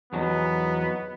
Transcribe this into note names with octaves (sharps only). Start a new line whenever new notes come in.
E2 F#3 B3 D#4